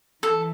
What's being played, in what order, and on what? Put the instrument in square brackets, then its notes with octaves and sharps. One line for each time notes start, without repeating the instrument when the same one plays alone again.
[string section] E3 [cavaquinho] A4